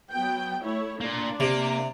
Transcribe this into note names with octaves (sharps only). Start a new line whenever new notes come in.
F#3 B3 G5
A3 E4 C#5
A#3 D4 F4 D5
C3 A#3